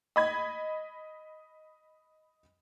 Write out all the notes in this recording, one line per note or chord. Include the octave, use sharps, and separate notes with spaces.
D#5 B5 G#6